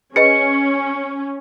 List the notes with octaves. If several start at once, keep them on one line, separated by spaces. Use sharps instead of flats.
C#4 G#4 B4 D#5 C#7